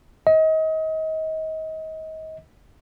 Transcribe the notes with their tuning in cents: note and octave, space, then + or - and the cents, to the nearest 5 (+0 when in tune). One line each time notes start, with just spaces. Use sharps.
D#5 +30